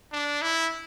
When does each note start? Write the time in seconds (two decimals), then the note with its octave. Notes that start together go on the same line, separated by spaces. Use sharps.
0.12 D4
0.42 E4